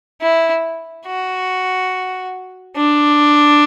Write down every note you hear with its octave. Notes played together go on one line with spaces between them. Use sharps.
E4
F#4
D4